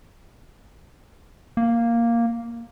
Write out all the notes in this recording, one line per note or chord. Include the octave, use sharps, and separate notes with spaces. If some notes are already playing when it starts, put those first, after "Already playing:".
A#3